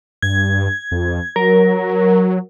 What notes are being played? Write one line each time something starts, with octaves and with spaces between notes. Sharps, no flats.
G2 G#6
F2
F#3 A#4